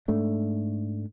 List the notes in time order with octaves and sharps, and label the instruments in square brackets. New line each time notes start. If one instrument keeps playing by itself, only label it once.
[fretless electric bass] G#2 A3 D4